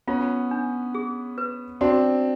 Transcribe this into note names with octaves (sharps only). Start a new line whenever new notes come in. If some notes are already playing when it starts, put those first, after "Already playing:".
B3 C#4 F4
D4
G#4
B4
C4 D4 F#4